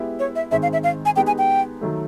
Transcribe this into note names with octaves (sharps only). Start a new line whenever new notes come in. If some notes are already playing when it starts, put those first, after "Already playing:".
Already playing: G#3 B3 E4 G4
C#5
E5
G#2 D#3 G#3 C4 E5
F5
E5
F5
G#5
G#3 B3 D#4 G4 G5
G#5
G5
D#3 F#3 A3